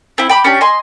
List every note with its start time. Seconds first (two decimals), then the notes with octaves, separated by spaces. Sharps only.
0.18 C4 E4
0.30 G5 B5 D6
0.44 C#4 D4 G4
0.61 D#5 G#5 C6